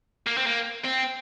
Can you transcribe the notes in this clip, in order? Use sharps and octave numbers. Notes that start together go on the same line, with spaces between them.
A#3
C4
A#3
C4